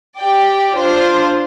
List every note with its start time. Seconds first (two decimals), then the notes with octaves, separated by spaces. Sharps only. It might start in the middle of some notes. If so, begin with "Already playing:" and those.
0.18 G4 D5 G5
0.74 D4 F4 C5